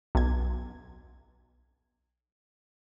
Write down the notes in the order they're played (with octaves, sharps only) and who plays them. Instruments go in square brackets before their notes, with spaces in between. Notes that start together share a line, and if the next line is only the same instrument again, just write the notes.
[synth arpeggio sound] B1 G#6